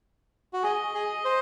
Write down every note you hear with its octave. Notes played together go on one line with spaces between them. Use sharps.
F#4
G#4 D#5
G#4
C5